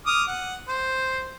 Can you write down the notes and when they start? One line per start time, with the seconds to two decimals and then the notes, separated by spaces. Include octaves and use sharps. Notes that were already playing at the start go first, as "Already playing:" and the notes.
0.06 D6 D#6 F6
0.27 F#5
0.68 C5